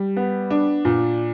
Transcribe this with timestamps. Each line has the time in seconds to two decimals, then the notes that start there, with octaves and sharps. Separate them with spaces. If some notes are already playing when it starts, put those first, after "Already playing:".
Already playing: G3
0.16 B3
0.50 D4
0.85 A#2